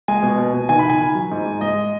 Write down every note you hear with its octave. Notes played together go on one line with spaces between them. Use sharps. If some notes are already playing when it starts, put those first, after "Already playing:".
G#3 G#5
B2
B2
B2
D#3 G#5
B5
D#3 G#5
D#3
F#3
G#2
G#2
G#3 D#5